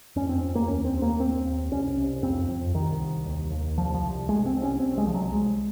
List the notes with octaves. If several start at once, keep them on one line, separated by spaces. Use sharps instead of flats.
F2 C#4
C4
F2
A#3
D#2 C#4
C4
D#2
A#3
D#2 C4
D#2
C2 C#4
C2
F2 C4
F2
C2 D#3
C2
D#2
D#2
C2 F3
F3
C2
C2 G#3
C4
C2
C#4
C2 C4
G#3
C2 F3
F#3
C2 G#3